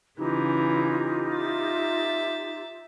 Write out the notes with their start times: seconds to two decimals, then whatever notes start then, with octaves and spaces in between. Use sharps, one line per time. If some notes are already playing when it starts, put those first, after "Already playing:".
0.18 C#3 E3 D#4 F4 G4
1.37 E5 A6